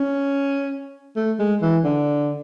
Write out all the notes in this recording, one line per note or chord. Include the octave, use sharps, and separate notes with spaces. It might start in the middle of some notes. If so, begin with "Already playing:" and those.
Already playing: C#4
A3
G#3
E3
D3